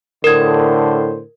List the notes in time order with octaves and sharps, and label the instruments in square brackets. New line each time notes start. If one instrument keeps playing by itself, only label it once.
[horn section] A2 D3 C5 [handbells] A#4 G#6